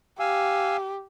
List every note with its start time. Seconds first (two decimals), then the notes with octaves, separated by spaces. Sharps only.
0.20 G4 F5 G#5 E6